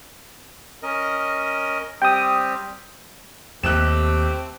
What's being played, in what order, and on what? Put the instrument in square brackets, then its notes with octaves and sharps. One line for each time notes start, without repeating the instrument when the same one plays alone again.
[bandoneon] C#4 A#4 D#5
[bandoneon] G3 C4 G4 [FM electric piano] G5 D#6
[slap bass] D#2 [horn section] A3 G4 [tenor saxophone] C4 [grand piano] F#6 E7